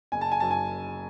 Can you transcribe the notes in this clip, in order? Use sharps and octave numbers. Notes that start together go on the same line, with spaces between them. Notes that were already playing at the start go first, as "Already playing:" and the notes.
F#1 G#5
A5
G#5
F#2 A5
G#5